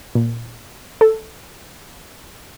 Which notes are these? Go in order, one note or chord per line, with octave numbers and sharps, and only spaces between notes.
A#2
A4